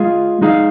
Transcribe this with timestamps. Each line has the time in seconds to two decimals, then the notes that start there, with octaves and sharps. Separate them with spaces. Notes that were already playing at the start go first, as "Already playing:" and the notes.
Already playing: G#3 F4 G#4 F5
0.41 G#3 D#4 G#4 F5